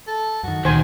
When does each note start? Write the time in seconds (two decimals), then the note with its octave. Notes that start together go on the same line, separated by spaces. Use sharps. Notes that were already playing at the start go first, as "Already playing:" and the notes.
0.07 A4
0.43 F#2 D#3 F#4
0.65 C#2 A#2 D#3 C5 G#5